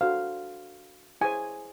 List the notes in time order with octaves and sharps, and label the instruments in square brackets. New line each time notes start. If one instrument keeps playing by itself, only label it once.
[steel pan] D4 F#4 A4 C5 F5
E4 G#4 C5 G#5